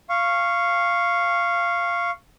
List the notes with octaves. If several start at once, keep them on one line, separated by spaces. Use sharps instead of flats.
F5 C#6